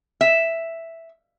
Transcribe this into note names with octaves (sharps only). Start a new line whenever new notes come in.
E5